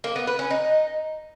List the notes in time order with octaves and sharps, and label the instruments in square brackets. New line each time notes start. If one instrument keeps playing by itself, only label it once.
[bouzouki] A#3
B3
B4
C#4
D#4